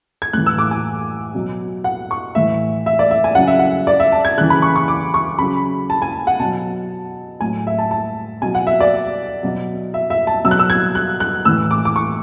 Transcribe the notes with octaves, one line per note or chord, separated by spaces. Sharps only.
G#6
A2 E3 F#6
E6
D6
G#5
B2 F#3
F#5
C#6
A2 E3 E5
E5
D5
E5
G#5
C#3 F#3 F#5
E5
F#5
D5
E5
A5
G#6
C#3 E3 F#6
B5
C#6
C#6
D6
C#6
C#3 F#3 B5
A5
G#5
F#5
B2 F#3 A5
A2 F#3 G#5
E5
A5
A5
B2 F#3 G#5
F#5
E5
D5
B2 F#3
E5
E5
A5
B2 F#3 E6
F#6
E6
G#6
F#6
F#6
A2 E3 E6
D6
D6
C#6